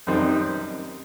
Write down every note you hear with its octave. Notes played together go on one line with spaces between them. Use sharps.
F#2 D#3 G3 C4 D#4